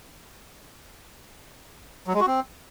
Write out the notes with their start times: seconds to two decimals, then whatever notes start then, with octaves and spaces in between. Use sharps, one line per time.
2.07 F#3
2.14 G#3
2.20 F#4
2.27 C4